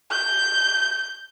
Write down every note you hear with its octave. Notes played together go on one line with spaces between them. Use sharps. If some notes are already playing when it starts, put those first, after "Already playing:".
G6